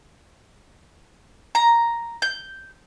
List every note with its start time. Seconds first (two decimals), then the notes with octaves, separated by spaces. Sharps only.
1.55 A#5
2.22 G6